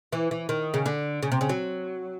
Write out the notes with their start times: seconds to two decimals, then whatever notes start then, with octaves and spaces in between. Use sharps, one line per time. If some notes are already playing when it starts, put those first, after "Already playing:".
0.12 E3
0.31 E3
0.49 D#3
0.74 C#3
0.86 D3
1.23 C#3
1.32 C3
1.41 C#3
1.49 F#3